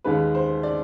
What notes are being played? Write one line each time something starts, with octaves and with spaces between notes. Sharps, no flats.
D#2 D#3 G#3 B4
C5
D5